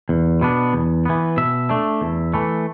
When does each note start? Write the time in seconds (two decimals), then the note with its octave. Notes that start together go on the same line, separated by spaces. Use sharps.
0.09 E2
0.41 B2 B3 D4
0.73 E2
1.05 E3 B3
1.37 B2 E5
1.69 A3 D4
2.01 E2
2.34 E3 A3